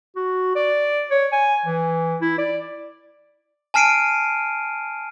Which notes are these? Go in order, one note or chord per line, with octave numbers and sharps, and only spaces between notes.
F#4
D5
C#5
G#5
E3
E4
D5
G#5 A5 F6 C7 D7 D#7